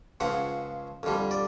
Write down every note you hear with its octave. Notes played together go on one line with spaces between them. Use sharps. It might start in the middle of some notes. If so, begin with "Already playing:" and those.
C#2 C#3 F3 F#5
F2 D3 G3
D5